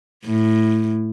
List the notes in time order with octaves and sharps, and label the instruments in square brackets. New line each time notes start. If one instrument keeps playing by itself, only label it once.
[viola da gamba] A2